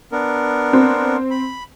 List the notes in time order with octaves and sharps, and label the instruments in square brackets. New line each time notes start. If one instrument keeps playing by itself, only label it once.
[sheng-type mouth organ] B3 D4 A#4
[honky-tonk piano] C4
[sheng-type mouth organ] B5